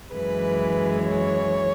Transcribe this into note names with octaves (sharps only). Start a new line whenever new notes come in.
F#2 E3 G#3 B4
C#5